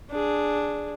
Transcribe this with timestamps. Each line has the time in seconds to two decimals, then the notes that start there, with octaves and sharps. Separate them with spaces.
0.11 D4 G#4